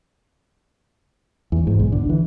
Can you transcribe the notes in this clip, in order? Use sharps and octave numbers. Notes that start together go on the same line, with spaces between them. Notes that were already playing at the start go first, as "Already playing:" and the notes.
E2
G#2
B1
D3
E3